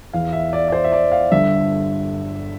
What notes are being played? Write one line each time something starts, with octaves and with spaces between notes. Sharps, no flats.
E2 E3 F5
E5
D5
D5
C5
E5
D5
F5
G1 G2 D3 E5